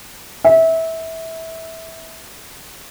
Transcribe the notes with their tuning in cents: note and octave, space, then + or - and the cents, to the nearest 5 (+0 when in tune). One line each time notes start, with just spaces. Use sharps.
E5 -20